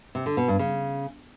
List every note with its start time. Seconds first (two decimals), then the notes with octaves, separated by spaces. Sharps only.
0.15 C3
0.26 D3
0.37 B2
0.48 G2
0.59 C#3